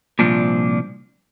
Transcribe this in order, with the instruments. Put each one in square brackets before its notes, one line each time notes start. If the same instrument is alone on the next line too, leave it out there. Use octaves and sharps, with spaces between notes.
[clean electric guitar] C2 A#2 F3 D4